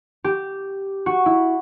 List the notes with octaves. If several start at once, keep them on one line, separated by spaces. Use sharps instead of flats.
G4
F#4
E4